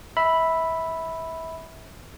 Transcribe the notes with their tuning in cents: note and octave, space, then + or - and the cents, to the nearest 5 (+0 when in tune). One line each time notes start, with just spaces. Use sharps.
E5 -25 B5 +0 E6 +0